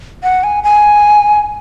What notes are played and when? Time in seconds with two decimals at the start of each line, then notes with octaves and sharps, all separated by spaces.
0.23 F#5
0.43 G#5
0.64 G#5